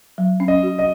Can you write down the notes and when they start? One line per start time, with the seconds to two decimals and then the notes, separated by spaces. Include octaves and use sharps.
0.18 F#3
0.40 C#4
0.48 D#5
0.63 F#4
0.79 D#5